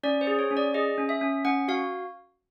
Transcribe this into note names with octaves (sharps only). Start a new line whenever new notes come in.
C#4 D5
C5
G#4
C#5
C#4
D5
G#4 D#5
C#4
E5
C#4
C#4 F#5
F#4 F5